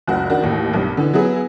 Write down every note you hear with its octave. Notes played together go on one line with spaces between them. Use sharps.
F#1 C#2 F#4
D#3 D4 F#4
A1 D#2 A2
B1 G2
D3 E3
F#3 B3 E4 G#4